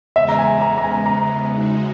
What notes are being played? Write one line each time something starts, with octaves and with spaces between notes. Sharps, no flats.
E2 C#3 G#3 B3 E5
A#5
G#5
A#5
A#5
G#5
A#5
C#3 G#3 D#4 F#4